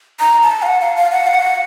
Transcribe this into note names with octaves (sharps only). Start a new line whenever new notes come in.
A#5
A5
F5
F#5
F5
F5
F#5
F5
F#5